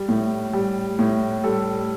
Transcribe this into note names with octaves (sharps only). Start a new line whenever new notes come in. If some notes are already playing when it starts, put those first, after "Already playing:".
Already playing: G3
A2
G3
A2
G3 A4